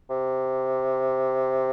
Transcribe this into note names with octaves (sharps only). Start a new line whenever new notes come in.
C3